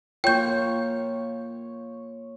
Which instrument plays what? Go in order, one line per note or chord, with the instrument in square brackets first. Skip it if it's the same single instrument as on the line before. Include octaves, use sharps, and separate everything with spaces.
[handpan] A#3 F4 [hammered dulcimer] C#5 C#6 [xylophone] G5 G6